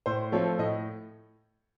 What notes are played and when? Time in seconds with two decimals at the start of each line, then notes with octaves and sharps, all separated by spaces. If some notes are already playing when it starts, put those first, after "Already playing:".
0.06 A2 C5
0.32 F3 A3 C4 C#5
0.58 A2 D#5